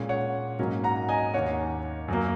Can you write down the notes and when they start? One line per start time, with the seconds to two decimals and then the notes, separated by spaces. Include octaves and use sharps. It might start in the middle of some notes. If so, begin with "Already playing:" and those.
Already playing: A#2 G#3 C#4
0.09 C#5 F#5
0.59 G#2 F#3 A#3 C#4
0.84 F#5 A#5
1.09 D#5 G#5
1.34 D#2 D#3 A#3 C#5 F#5
2.08 F#2 F#3 A#3